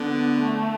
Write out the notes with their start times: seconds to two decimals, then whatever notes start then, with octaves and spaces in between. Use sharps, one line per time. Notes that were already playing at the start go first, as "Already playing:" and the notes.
Already playing: D3 B3
0.40 A3